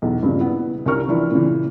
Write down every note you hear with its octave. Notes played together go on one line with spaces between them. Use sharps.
B1 E2
G2 A#2 C#3
B3 E4
C2 C#4 D4 A#4 C#6 F6
E3 F3 D4 E4
A#2 C#3 E3